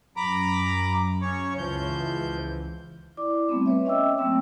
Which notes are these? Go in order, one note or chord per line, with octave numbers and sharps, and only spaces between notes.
F#2 A#5 B5 D6
C#3 C#5
C#2 E3 F3 G6
E4 D5 D6
G3 A3 B3 C4
B4 C#5 E5
C#4 D#5 E5 G5 D6 E6
F#3 A3 A#3 C4 G5 E6